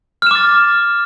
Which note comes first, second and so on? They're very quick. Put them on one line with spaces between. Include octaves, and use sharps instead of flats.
F6 E7 D6 A6